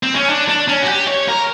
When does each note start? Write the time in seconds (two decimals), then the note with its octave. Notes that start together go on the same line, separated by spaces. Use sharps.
0.03 C4
0.15 C#4
0.29 D4
0.49 D4
0.68 C#4
0.83 F#4
0.89 G4
1.08 C#5
1.28 A#4